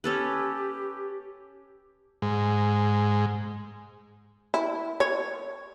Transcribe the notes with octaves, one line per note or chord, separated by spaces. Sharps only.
C#4 G4 A4 B4
G#2
E4
C#5